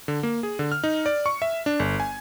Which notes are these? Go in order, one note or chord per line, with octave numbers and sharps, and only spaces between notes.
D3
A#3
G#4
D3
F6
D#4
D5
C#6
E5
D4
G1
G#5